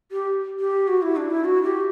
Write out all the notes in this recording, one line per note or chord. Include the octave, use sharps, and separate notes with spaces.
G4
G4
F#4
E4
D4
E4
F#4
G4